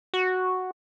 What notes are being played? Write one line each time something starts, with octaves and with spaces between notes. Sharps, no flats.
F#4